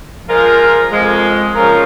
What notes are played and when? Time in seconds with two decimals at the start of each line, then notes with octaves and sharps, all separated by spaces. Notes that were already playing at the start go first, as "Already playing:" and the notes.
0.29 F3 G#3 F4 A#4
0.92 F2 F3 G#3
1.55 C#3 F3 C#4 F4 A#4